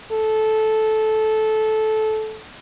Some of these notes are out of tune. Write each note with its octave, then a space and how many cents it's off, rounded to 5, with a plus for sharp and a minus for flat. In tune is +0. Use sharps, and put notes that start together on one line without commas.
A4 -15